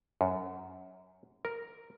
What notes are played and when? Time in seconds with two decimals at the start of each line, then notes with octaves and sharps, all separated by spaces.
0.21 F#2
1.45 A#4